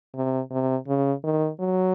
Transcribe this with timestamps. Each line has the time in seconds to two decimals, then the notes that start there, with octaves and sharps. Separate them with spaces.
0.15 C3
0.51 C3
0.87 C#3
1.23 D#3
1.60 F#3